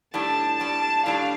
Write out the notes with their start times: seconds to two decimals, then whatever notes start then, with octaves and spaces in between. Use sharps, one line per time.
0.14 A2 G3 D4 A5
0.60 A2 G3 D4 A5
1.06 A2 G3 D4 F5